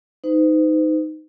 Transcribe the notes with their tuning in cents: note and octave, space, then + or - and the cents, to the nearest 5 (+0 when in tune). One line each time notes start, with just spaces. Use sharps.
D#4 +5 C5 -45